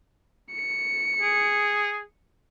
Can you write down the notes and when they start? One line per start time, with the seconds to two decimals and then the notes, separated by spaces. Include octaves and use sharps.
0.53 C#7
1.21 G#4